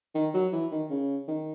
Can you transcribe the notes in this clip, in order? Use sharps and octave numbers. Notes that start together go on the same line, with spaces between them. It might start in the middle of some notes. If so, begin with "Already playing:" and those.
D#3
F#3
E3
D#3
C#3
D#3